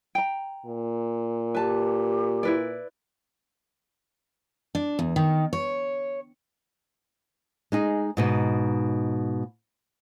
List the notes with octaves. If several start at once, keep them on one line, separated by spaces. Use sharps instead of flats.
G5 A#5
A#2
G4 B4 A5
E4 B4 D5
D4
E2
D#3
C#5
G#3 D#4 G#4
G#2 B2 D#4